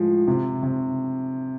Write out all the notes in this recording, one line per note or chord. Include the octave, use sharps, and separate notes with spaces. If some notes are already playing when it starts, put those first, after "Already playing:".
Already playing: A2 F3 G#3
C3
C3